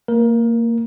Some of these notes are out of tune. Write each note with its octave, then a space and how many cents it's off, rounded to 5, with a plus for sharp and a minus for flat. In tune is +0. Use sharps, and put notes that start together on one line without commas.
A#3 -20 A#4 +20